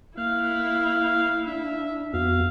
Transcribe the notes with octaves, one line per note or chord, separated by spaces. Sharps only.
A#3 E4 F5 F#6
D4 E5
F2 B3 F#4 F5